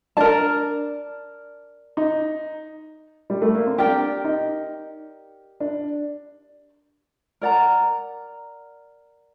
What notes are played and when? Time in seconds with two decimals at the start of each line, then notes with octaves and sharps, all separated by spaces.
0.17 D4 A#4 D5 A5
1.97 D#4
3.30 G3
3.41 A3
3.54 A#3
3.66 C4
3.78 D4 G4 A#4 D5 G5
4.24 D#4
5.60 D4
7.41 A#4 D5 F#5 A#5